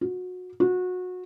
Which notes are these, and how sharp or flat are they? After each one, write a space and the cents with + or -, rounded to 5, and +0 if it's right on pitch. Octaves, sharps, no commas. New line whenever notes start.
F#4 -25
F#4 -25